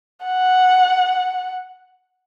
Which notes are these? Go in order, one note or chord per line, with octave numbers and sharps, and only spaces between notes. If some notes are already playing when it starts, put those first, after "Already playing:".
F#5